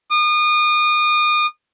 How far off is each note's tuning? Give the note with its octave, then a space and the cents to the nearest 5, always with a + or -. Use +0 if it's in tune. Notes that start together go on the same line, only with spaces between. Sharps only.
D#6 -35